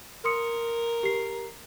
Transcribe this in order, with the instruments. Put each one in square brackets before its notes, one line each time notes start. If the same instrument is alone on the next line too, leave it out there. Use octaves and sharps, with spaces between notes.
[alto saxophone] A#4 [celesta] C6 D#6 C#7
[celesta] G4 C7